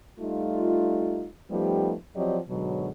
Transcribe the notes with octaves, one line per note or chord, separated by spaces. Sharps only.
G3 A3 D#4 F4
F3 G3 A3 B3 D#4 G4
F3 F#3 C4 G4 D5 D#5
G#2 B2 D3 F#3